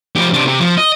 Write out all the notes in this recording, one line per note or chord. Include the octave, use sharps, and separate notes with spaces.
F3 G4
C3 D4
C3
F3
D#5